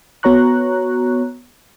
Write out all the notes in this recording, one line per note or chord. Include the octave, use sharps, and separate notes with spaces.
B3 F#4 C#5 A#5 C#6 F#6